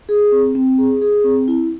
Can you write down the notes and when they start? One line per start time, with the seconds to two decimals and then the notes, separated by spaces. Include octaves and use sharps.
0.09 G#4
0.32 C4
0.55 C4
0.78 G#4
1.01 G#4
1.24 C4
1.48 E4